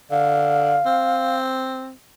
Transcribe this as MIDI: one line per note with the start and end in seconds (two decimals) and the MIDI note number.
0.11 0.78 50
0.11 1.38 77
0.86 1.92 60